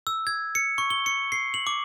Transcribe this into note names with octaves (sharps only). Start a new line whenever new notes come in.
E6
G#6
C#7
C#6
G7
C#7
C7
F#7
D6